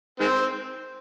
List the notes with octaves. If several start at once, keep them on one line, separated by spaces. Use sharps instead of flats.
D#3 G#3 C4